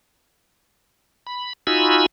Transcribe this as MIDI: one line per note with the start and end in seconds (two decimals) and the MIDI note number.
1.27 1.53 83
1.67 2.06 63
1.67 2.06 65
1.67 2.06 66
1.67 2.06 80
1.67 2.06 83
1.67 2.06 88